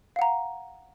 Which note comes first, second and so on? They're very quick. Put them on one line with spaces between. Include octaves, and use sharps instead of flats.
F5 F#5 A#5